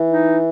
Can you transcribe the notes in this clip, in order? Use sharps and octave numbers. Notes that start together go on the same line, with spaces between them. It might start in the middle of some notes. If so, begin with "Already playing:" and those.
Already playing: E3
D#4